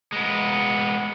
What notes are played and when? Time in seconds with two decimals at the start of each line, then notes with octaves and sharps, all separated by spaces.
0.12 G#3 B3